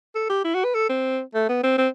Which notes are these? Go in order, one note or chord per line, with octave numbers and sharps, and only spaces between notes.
A4
G4
E4
F#4
B4
A4
C4
A3
B3
C4
C4